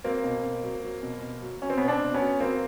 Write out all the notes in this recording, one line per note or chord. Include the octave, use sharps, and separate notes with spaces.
F#3 A#3 C4
B2
B2
F#3
F#3
B2
B2
F#3
F#3 C#4
C4
B2 B3 C#4
C4 D4
B2
B3 C#4
F#3
F#3 A#3 C4